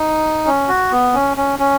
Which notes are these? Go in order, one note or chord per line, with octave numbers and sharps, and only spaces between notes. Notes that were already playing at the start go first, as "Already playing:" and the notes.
Already playing: D#4
C#4
F#4
B3
C#4
C#4
C#4